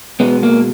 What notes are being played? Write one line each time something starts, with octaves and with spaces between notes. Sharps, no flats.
B2 G#3 B3
A#3